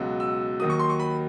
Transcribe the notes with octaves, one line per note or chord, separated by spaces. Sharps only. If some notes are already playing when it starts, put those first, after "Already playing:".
Already playing: C#2 B2 F#3
E6
D#2 D#3 F#3 D#6
C#6
C6
C#6
B5